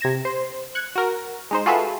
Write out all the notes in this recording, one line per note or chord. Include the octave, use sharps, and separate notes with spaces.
C3 G#6 A#6 E7
C5
F#6 G#6 C#7
F#4 A#4
G#3 D#4 C5
F4 F#4 G#4 A4 B4 E5